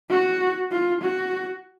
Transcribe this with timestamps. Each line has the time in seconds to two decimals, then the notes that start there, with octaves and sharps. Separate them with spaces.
0.10 F#4
0.71 F4
1.02 F#4